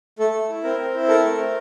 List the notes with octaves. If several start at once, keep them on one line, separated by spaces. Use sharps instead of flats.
A3 A4
A3
E4
C4 A#4
C4
E4
A4 A#4
A3
C4